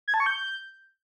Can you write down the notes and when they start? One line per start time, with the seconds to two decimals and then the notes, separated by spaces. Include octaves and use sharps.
0.08 G#6
0.14 A5
0.20 C#6
0.26 G6